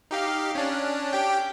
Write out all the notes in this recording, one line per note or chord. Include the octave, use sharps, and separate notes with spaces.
D#4 G4 F5
C#4 D4
G4 G5